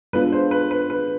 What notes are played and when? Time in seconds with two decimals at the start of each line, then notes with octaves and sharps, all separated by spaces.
0.13 G#3 B3 D4 F4 A4 B4
0.32 C5
0.51 B4
0.71 B4
0.90 B4